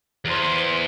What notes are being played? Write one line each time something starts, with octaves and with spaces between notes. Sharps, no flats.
E2 C5